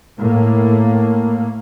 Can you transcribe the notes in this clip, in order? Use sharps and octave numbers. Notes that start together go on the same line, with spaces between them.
A2 A#3